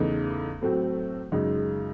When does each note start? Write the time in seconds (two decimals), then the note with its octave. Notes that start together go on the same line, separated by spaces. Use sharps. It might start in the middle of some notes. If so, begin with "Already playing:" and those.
Already playing: E2 C#3 E3 A3 D#4
0.61 A2 F#3 A3 C4 F#4
1.32 F#2 C#3 G#3 D#4